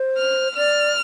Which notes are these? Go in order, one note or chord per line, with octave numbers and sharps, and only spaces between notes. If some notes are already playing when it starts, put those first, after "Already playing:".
Already playing: C5
F6
D5 F6